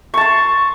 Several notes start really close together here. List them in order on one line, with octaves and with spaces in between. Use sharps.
C#6 A5 C6